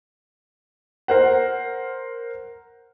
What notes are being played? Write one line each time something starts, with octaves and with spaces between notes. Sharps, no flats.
A#4 C5 F#5